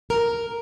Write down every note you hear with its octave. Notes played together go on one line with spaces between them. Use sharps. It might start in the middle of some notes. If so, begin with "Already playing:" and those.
A#4